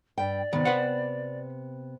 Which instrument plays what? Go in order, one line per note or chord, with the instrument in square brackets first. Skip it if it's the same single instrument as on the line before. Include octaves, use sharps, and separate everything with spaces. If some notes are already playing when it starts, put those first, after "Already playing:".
[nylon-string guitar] G2 G5 [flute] D5
[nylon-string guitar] C3 B3 [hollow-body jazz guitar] D#3
[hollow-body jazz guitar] B4 C5 F#5